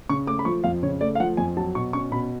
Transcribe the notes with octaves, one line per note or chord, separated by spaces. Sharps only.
C#3 C#6
A3 D6
B5
F3 C#6
F2 F5
C#3 C#5
A3 D5
F5
F3 F#5
F2 G#5
F#3 A5
B2 C#6
C#4 C#6
B2 B5